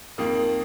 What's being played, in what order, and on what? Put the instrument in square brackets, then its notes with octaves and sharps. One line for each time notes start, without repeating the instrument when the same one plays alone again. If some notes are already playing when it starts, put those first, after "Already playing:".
[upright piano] F2 D#3 A#3 D#6